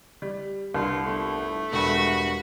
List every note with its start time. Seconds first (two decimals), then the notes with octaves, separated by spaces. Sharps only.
0.22 G3
0.74 C2 G2 F4
1.06 G1 A3
1.72 E1 G2 F#4 B5